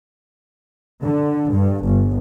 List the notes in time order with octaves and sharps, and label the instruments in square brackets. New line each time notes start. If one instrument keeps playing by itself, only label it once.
[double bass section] D3
G2
G1